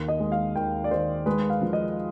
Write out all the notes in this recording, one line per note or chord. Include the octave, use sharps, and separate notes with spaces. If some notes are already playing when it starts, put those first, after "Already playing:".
Already playing: D#2
D#5
G#3
F5
D#2 G5
D5
D#3 C5
G#3 B4
F5
F3
D#5